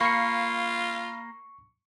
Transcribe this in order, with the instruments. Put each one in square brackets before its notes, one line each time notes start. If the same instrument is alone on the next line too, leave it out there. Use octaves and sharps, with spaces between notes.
[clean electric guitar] A#3 [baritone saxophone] F4 [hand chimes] B5 [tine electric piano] C#6 C7 C#7